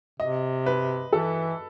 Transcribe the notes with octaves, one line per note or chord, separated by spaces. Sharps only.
C3 D#5
B4
E3 A4